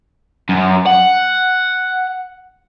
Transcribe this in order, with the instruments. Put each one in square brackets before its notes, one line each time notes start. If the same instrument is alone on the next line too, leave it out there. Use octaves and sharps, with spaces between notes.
[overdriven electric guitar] F#2
F#5